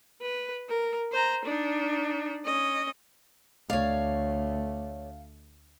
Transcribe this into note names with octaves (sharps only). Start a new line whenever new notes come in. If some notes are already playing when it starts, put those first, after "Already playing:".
B4
A#4
C5 A#5
D4 D#4
C#4 D#5
D2 A3 C#5 D5 F5